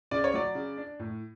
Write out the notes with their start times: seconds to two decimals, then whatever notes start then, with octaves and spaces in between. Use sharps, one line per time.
0.11 C#3 D5
0.24 C#5
0.34 F#3 D5
0.55 C#3
0.77 D4
0.99 A2